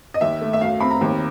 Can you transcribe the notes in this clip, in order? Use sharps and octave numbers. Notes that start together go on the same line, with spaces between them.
D#5
D#2 E5
A3
E5
F#2 F5
C4 B5
A#5
D#2